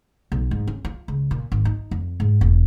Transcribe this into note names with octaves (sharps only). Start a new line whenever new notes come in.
B1
G#2
C#4
F4
C#2
A#2
G#1
D#4
F2
G#2
E1